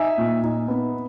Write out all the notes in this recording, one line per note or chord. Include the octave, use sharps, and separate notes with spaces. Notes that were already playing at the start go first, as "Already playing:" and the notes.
Already playing: D#4 E5 G#5
A#2
D#4
B3